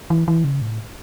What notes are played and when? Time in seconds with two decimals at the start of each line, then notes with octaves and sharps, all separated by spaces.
0.10 E3
0.28 E3
0.44 C#3
0.62 A2